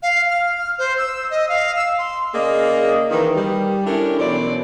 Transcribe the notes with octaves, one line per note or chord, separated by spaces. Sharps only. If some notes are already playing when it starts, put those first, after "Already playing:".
F5
F6
C5
E6
D#5
F5
E6
C6
C#3 A#3 G#4 D5 D#5 F5
D#3 E3
G3
C#4 D4 E4 G4 A4 A#4
B2 E3 F#3 C5 D5